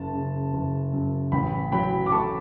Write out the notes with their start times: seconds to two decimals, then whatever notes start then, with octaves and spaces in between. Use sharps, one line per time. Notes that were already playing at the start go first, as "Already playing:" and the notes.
Already playing: F#1 A5
0.14 C#3
0.54 F#1
0.93 F#2
1.32 A1 G5 B5
1.72 F#3 G5 B5
2.06 D6
2.11 A3 A5 C#6